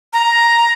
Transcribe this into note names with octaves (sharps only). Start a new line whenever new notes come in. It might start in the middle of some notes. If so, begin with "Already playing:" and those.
A#5